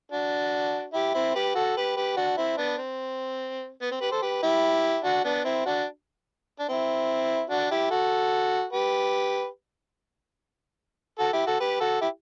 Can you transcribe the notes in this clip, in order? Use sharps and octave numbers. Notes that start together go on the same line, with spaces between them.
D4 F#4
E4 G4
C4 E4
G4 B4
F#4 A4
G4 B4
G4 B4
D4 F#4
C4 E4
B3 D4
C4
B3
C4
G4 B4
A4 C5
G4 B4
E4 G4
D4 F#4
B3 D4
C4 E4
D4 F#4
D4
C4 E4
D4 F#4
E4 G4
F#4 A4
G4 B4
F#4 A4
E4 G4
F#4 A4
G4 B4
F#4 A4
E4 G4